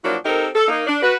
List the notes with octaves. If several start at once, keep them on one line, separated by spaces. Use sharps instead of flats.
F3 F#3 A#3 D4 E4 F#4
C4 D#4 G4 A4 A#4
A4
A#3 D#4
D4
F#4 B4